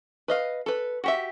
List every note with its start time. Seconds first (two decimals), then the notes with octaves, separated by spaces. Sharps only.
0.28 B4 D#5 F5
0.66 A4 B4
1.04 F#4 G4 E5